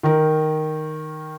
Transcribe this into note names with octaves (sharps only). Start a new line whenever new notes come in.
D#3 A#4